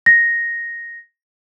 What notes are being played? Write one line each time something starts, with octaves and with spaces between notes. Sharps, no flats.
A#6